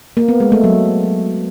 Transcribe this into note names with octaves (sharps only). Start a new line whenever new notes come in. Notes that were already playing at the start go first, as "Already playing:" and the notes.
A#3
B3
G#3
A3
F#3